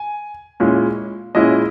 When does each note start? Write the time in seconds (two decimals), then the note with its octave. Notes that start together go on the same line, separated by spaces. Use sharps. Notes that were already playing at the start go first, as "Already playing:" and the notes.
Already playing: G#5
0.60 A#2 G#3 C#4 E4
1.35 A#2 G#3 C#4 E4 D#5